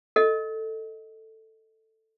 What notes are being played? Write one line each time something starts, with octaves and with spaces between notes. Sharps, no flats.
A4 D#5